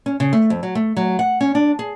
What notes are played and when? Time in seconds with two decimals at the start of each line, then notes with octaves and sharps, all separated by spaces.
0.06 C#4
0.20 C#3
0.33 A3
0.50 F2
0.63 F#3
0.75 A3
0.97 F#3
1.19 F#5
1.41 C#4
1.55 D4
1.79 G#4